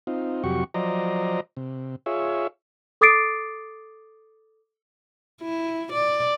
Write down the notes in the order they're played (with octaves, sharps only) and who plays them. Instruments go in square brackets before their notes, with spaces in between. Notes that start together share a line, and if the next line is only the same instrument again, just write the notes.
[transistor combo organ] C4 D#4 F4
F2 C3 F#3 F#4 G4 C#6
F3 F#3 C5 D5 D#5 A#5
C3
F4 G#4 C#5 E5
[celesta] A4 D6 D#6 A6 C7 D7
[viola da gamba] E4
D5